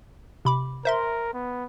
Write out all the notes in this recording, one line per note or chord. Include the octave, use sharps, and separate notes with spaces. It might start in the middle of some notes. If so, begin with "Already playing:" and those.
C3 B5 D6
A#4 C5 E5 C6
B3